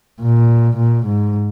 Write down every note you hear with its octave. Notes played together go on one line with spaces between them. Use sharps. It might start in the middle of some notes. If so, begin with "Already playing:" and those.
A#2
A#2
G#2